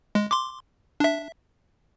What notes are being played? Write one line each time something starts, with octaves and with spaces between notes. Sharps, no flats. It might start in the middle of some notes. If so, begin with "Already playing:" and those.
G#3
C6 D6
D4 E5